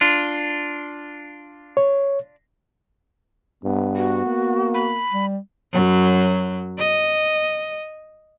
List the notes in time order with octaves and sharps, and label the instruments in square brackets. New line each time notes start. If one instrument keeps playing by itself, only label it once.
[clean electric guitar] D4 F4
[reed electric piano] C#5
[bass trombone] G2 [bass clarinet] B3
[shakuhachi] F#4
[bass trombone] A#3
[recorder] B5
[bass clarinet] G3
[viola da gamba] F#2 F#3
D#5